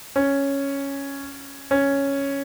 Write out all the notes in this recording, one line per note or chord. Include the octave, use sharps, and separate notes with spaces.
C#4
C#4